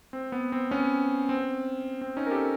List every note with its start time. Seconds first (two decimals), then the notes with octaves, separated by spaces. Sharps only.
0.13 C4
0.32 B3
0.52 C4
0.71 B3 C#4
1.29 C4
2.01 C4
2.17 C#4 D#4
2.26 A#4
2.31 G4 A4